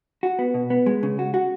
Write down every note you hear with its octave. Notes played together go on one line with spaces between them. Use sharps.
F#4
B3
B2
B3
G#3
C#3
F#4
F#4